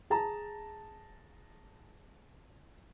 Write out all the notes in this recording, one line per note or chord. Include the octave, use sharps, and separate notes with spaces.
G#4 A5 A#5